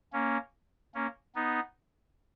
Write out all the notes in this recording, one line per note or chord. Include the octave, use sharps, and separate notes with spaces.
A#3 C#4
A#3 C#4
B3 D#4